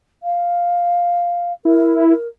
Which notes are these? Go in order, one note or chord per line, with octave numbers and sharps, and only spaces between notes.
F5
E4 A#4
A#4